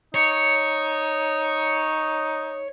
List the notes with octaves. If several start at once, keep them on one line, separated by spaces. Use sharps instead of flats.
D#4 C#5